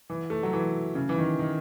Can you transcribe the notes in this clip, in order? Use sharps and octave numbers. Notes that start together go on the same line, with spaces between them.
E3
A3
F#3
E3
C#3
E3
D#3
D#3